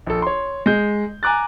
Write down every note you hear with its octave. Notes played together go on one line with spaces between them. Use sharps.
A#1 A4
C#5 C6
G#3 G6
G#5 A#5 D6 F#6 A6